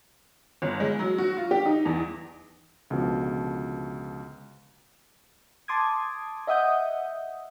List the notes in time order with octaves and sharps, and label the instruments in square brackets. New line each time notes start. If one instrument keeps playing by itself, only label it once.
[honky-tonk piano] G1
G#3
F#3
F#4
F4
G4
D#4
E2
[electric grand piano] C#2 B2 D3 F3
[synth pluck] A5 C6 D6 D#6 G#6
D#5 E5 F#5 D#6 G6